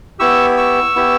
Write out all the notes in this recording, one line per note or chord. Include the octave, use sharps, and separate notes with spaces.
B3 E4 G4 C#6 E6
C#6 E6
B3 E4 G4